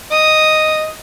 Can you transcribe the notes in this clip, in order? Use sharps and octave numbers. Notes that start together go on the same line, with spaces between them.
D#5 D#6